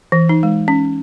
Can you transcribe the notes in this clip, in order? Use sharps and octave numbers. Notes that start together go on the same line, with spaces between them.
E3
D#4
G#3
C#4